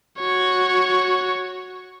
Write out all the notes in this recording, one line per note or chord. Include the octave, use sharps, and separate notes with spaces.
F#4 C#5